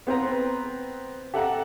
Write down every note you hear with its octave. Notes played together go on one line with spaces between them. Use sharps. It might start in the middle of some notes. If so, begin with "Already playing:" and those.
B3 C4 B4 A#5
G4 A4 E5 F#5 A#5